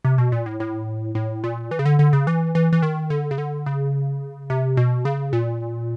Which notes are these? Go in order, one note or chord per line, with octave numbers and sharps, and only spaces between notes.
C3
B2
A#2
A2
A2
A2
A#2
E3
C#3
D3
D3
C#3
E3
E3
E3
D#3
D3
C#3
D3
C#3
C3
B2
C#3
A#2